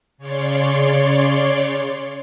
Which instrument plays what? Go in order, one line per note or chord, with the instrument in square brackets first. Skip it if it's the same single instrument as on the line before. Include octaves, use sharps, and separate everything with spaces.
[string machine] C#3 C#5 D5 C6